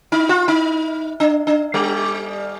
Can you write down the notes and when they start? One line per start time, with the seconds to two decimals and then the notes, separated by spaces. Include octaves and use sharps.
0.12 D#4
0.29 F4
0.48 D#4
1.20 D4
1.47 D4
1.74 G3